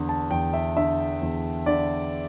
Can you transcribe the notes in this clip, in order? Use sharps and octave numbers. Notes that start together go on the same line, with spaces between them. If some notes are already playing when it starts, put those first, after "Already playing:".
Already playing: E2 D3
A5
E2 G5
E5
D3 E5
E2
D3 D5